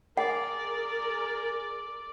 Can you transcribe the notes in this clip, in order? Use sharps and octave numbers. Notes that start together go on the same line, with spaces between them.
G#4 A#4 D5 F#5